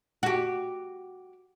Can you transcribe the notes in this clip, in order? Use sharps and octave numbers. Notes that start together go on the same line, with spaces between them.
F#4 G4